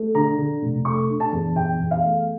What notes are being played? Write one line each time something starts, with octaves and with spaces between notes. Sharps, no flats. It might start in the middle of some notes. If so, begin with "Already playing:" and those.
Already playing: A3
D3 A#5
D3
F1
A3 C#6
D4
A5
E2
E2 G5
E2
F5
A3